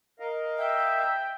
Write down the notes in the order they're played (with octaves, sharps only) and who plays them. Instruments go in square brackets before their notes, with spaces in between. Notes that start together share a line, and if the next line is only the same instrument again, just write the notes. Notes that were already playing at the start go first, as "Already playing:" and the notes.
[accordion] A#4 D#5 F5
[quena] E5 [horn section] G5